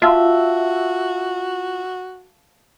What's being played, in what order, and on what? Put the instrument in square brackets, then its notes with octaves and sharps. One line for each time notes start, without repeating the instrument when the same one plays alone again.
[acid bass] F4 [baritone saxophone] F#4 [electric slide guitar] E5 [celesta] F5 A5 E6